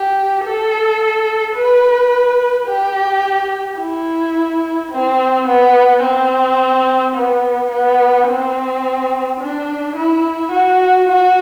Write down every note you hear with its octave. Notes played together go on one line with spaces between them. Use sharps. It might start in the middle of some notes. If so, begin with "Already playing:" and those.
Already playing: G4
A4
B4
G4
E4
C4
B3
C4
B3
B3
C4
D4
E4
F#4
F#4